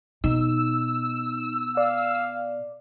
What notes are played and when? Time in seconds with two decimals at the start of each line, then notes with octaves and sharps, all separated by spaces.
0.24 B2 D#4 E6
1.77 D5 F5